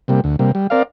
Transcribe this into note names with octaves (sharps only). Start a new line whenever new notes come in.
C3 G3 A#3
D2
C3 G3 A#3
G3
C4 A#4 D5 F5